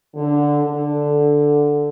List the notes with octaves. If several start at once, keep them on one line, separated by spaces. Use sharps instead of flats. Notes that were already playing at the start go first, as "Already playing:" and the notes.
D3
D3